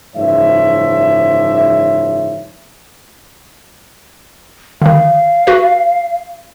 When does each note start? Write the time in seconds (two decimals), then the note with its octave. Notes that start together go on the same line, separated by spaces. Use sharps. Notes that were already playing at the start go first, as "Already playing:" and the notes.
0.16 F#1 G#2 E3 F3 C#5 E5
4.82 D3 D#3 F5
5.47 F#4 B4